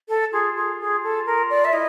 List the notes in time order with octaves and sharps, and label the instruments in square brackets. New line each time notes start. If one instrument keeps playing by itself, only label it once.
[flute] A4
[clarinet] F4 [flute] G#4
[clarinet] F4 [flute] G#4
[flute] G#4
A4
A#4
D5
E5
[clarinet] E4 [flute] D#5